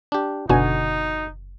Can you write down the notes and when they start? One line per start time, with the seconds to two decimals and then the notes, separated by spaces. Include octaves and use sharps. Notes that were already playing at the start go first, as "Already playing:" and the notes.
0.12 D4 G4
0.49 F#1 B2 D3 D#4 F#4 G#5